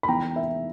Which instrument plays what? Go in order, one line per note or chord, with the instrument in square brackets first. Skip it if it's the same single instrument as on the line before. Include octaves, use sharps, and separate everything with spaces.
[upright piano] B5
E2 G5 A#5
E5